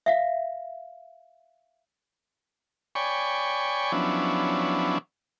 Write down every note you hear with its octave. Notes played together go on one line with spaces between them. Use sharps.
E5 F5
C#5 D5 G5 G#5 B5 C#6
F3 F#3 B3 C#4 D4 E4